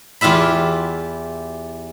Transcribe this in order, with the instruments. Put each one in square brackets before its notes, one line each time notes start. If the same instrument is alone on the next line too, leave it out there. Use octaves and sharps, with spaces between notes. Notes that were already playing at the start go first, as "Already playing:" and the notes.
[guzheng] E2 F4 G4 E5 B5